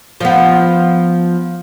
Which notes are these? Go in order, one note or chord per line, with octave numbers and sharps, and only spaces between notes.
F3 B3